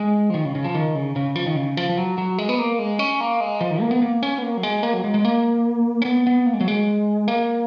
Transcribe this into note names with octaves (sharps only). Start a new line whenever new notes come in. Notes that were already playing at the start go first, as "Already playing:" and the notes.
Already playing: G#3
F3
D#3
C#3
C#3
F3
D#3
C#3
C#3
F3
D#3
C#3
F3
F3
F#3
F#3
G#3
B3
A#3
G#3
C#4
A#3
G#3
F3
D#3
A#3
B3
A#3
C#4
B3
A#3
F#3
G#3
A#3
F#3
G#3
G#3
A#3
C#4
B3
B3
A#3
G#3
F#3
G#3
A#3